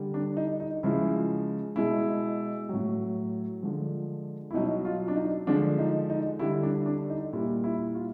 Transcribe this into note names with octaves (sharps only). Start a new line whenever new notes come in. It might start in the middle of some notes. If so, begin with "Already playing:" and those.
Already playing: D3 G3
D4
D#4
D#4
C#3 F3 G#3 E4
B2 G#3 E4
A2 F#3
D3 F3 G#3
E4
B2 F#3 D#4
F4
D4
D#4
D3 F3 G#3 D4
D#4
D#4
D3 G3 E4
D4
D4
D#4
A#2 G3 E4
E4
F4